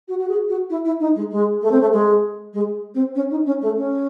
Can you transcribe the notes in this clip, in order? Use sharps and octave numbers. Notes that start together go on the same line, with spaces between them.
F#4
F#4
G#4
F#4
E4
E4
D#4
G#3
G#3
A3
C4
A3
G#3
G#3
C4
C#4
D#4
C#4
A3
C#4